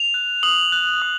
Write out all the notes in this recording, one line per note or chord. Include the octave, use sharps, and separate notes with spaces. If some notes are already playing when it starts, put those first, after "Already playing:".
Already playing: F7
F#6
D#6 F#7
F#6
D#6